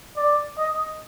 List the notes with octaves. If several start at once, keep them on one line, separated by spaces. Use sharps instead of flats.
D5
D#5